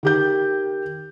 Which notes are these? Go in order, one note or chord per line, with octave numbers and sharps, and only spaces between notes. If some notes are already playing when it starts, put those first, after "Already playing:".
D#3 G4 G6